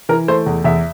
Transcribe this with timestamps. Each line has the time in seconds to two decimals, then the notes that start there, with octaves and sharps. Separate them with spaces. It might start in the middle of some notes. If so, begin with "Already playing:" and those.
0.09 E3 A#4
0.28 A3 C5
0.46 E2
0.64 E2 E5